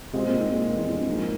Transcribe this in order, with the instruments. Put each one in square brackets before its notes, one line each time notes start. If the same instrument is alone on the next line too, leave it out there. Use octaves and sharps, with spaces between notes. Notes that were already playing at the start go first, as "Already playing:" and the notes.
[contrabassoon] C3 [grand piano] G#3 C4 F4 C5
[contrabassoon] A#2
G#2
A#2
E2
F2
G2
[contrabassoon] G#2 [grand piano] F3 A#3 F4